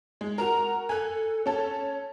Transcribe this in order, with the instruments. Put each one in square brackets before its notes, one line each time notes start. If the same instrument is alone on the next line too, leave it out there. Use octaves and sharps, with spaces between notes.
[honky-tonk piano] G#3
[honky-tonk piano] F#4 A#4 [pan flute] A#5
[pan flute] A4 [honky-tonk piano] G#5 F#6
[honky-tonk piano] C#4 A4 A5 [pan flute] C#5